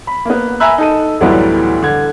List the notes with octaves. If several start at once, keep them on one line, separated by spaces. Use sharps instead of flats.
B5
A#3 B3
E5 G#5 A#5 B5 E6 F#6
D#4 A4 D#7
D2 A2 E3 F#3 G3 B3
D3 G#6